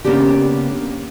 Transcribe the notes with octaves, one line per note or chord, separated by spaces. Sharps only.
C#3 A#3 B3 D4 G4